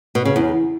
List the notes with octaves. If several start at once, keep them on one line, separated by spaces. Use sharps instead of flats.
B2
C#3
E2